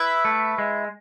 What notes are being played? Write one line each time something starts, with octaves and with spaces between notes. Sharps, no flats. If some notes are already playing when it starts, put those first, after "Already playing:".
Already playing: E4 B4 E5
A3
G#3